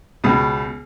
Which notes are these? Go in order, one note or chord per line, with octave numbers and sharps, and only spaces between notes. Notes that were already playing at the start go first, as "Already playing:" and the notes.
C#2 B2